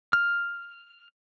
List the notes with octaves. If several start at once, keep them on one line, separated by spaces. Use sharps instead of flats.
F6